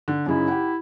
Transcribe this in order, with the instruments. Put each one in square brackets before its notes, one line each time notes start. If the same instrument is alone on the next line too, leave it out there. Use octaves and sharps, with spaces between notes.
[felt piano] D3
[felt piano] F#2 C#3 D#4 [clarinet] E4
[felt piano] G4 F#5